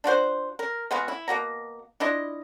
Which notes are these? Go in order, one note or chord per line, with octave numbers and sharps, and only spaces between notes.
D4 F4 F#4 C5
A#4
G#3 B3 F4 F#4
E4
B2 A#3 F#4 A#5
D4 E4 F4 D#5